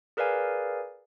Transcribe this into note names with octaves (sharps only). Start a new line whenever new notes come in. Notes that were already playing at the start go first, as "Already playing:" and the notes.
G#4 A#4 B4 D5 F5 G#5